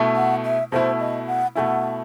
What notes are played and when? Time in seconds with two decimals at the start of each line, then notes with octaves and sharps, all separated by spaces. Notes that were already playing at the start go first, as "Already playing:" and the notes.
Already playing: B2 A3 E4
0.16 F#5
0.44 E5
0.72 B2 A3 E4 C5
1.00 D#5
1.27 F#5
1.55 B2 A3 E4 F#5 G#5